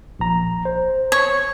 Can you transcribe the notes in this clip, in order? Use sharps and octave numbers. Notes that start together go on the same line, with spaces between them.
A#1 A#5
C5
C#5